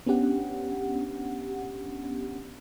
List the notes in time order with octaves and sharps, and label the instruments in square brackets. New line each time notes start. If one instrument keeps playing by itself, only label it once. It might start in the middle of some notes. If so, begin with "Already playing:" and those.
[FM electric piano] B3 C#4 D4 G4 F#5